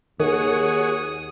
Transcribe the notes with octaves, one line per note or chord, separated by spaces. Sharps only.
D#2 D#3 F#4 G#4 C#5 D#6